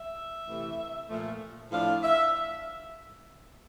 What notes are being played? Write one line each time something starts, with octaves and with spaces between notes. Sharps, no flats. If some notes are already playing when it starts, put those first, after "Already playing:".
Already playing: E5
C3 E3 A3
A#2 F3 A3
A2 F3 A3 D4 F5
E5